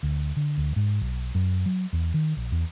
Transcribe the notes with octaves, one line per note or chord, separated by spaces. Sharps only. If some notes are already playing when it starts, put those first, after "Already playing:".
D2
D3
D2
G#2
B1
F#2
F#3
E2
D#3
A#1
E2